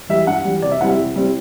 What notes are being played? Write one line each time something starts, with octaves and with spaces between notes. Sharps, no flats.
E3 G3 E5
G2 F#5
E3 G3
C3 D5
E5
G3 C4 E4 F#5
E5
C3
G3 C4 E4